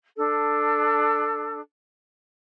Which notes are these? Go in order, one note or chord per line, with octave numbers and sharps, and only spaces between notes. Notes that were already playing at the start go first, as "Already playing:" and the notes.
D4 A4